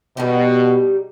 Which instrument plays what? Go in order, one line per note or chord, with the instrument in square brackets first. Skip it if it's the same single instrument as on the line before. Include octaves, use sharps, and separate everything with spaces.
[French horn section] B2 [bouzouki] G3 D#4 G4